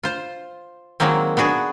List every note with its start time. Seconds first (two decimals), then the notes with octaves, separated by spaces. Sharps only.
0.03 F4 C5
1.00 D#3 F#3 G#3 A#3 C4
1.37 B3 D4 F#4 G#4